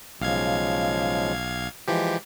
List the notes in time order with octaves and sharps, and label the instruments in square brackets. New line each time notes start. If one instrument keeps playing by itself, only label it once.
[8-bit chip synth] B1 F5 G#6 [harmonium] C#3 F3 G#3
[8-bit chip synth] E3 F3 G4 [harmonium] G#3